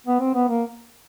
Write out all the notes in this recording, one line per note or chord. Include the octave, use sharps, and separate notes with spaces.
B3
C4
B3
A#3